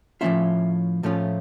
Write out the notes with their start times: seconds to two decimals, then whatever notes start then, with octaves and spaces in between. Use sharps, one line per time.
0.21 A2 F3 A3 C#4 F4 E5
1.03 A2 F3 A3 C#4 F4